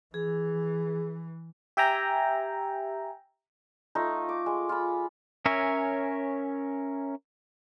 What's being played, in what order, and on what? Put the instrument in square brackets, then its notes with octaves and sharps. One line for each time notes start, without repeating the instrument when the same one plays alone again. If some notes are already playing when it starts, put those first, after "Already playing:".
[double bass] E3 [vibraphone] G#4
[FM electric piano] G4 E5 G5 G#5 A#5
[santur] A3 D#4 F4
D6
G#3
F4 B5
[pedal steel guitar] C#4 A#4 C#5 E5 G#5